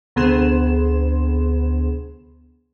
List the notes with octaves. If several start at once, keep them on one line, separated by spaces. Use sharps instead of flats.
D2 C3 B3 G#4 C6 E7